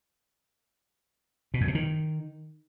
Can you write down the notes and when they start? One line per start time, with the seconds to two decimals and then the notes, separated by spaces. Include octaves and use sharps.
1.54 B2
1.61 F#2
1.68 B2
1.75 D#3